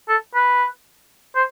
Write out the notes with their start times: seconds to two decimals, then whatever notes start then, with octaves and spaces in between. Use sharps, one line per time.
0.09 A4
0.34 B4
1.35 C5